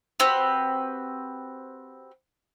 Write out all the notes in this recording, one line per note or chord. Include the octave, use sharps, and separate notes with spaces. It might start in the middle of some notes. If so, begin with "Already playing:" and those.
C4 F#4 G4 B4